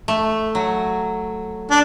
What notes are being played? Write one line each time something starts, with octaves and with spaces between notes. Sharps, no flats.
A3
F#3
D4